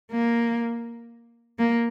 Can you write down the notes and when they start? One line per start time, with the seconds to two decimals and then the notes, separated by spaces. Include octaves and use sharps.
0.12 A#3
1.59 A#3